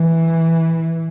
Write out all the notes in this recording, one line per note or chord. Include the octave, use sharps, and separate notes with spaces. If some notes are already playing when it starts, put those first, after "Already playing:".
Already playing: E3